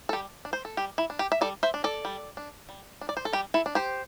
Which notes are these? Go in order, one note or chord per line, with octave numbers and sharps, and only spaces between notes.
A4
G3 G4
D4
C5
A4
G3 G4
E4
D4
G4
E5
G3 A4 D5
C5 E5
D4
A4 D5
G3
D4
G3
D4
D5
C5
A4
G3 G4
E4 A4
D4
G4 C5